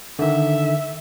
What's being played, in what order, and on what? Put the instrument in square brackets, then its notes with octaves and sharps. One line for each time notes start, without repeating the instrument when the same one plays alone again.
[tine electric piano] D3 D#3 [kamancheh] E5